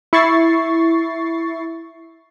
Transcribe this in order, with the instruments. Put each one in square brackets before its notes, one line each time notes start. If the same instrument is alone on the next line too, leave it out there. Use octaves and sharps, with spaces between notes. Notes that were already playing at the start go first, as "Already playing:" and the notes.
[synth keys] E4 C#6 A6 C7